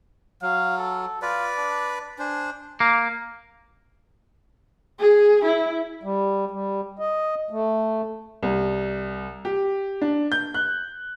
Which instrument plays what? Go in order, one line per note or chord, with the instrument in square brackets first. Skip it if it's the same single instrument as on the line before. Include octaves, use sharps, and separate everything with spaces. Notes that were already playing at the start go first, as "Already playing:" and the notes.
[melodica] F#3 [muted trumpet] F5
[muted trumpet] A4
[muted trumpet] F4 [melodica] B4 D5
[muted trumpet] D4
[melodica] D4 C5 [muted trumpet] G#5
[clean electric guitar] A#3
[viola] G#4
E4
[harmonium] G3
G3
D#5
A3
[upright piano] C2
G4
D4
G6
F#6